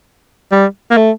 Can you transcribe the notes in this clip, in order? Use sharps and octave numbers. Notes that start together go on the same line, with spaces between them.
G3
A#3
A3